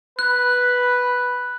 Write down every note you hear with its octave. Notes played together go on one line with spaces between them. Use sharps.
B4 F#6